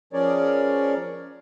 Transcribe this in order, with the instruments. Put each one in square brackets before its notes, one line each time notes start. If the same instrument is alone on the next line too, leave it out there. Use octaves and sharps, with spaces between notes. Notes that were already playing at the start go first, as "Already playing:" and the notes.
[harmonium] F3 C#4 G#4 A#4 C#5 D5